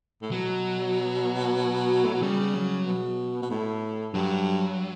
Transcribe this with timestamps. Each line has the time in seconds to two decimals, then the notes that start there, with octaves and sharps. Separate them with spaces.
0.22 A2
0.31 B2 F#3
2.04 A2
2.13 B2
2.22 C#3 G3
2.55 F#3
2.86 B2
3.42 B2
3.51 A2
4.13 G2 F#3